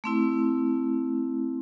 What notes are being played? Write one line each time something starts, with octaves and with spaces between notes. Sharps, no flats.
A3 C4 E4